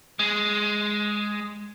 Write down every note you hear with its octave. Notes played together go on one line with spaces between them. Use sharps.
G#3